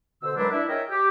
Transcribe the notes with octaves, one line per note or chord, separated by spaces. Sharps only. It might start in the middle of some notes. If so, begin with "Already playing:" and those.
B2 D3 C5 E6
F#2 F#3 G#3 D4 E4 B4
D4 E4 E5
G#4 A#4 C#5 D#5 E5 G5
G4